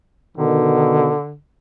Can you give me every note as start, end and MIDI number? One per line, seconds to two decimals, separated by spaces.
0.37 1.10 47
0.37 1.36 50
0.37 1.10 51